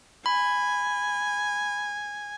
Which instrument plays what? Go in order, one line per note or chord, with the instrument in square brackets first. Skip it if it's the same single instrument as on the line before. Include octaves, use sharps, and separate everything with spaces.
[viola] G#5 [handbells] B5